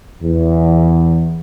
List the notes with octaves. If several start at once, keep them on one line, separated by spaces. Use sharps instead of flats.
E2